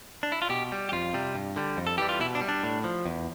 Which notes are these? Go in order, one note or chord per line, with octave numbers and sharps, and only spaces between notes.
D4
E4
F4
B2 G4
G3
G4
F2 F4
C3 G3
G2
D3 G3
F2
A4
E3 G3 G4
F4
B2 E4
D4
G3
D4
A2
F3
E2